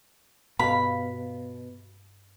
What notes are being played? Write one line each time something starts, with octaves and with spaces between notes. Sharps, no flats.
G2 B2 F5 B5